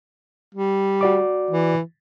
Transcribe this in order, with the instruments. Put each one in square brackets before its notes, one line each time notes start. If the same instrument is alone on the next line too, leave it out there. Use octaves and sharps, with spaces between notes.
[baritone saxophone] G3
[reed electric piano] F#4 D5 D6
[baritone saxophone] E3